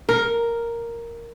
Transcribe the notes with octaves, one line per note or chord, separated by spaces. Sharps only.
A#4